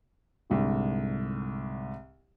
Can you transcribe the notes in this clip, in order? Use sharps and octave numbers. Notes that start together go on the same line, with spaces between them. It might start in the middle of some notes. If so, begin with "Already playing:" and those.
C2 G#2 D3